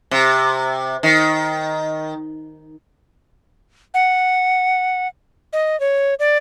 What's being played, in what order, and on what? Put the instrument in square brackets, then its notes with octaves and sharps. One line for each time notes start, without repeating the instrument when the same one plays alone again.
[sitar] C3
D#3
[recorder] F#5
D#5
C#5
D5